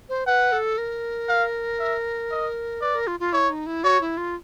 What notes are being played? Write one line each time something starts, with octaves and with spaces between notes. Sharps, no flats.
C5
B4 F#5
A4
A#4
F5
E5
D#5
B4 D5
A#4
F4
F4
E4 C#5
D#4
E4
F#4 C#5
E4
F4